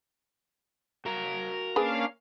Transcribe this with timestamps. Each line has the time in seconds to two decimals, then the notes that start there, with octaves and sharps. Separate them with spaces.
1.06 F#4 A#4 F5 A#5
1.76 A#3 C#4 D4 G#4 B4 F5 G#5